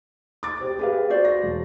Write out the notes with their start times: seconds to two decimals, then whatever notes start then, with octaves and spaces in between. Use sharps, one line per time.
0.43 D6 A6
0.60 G4 C5
0.79 G4 G#4 B4 F5
1.10 F#4 C5 D5
1.25 A#6
1.43 E1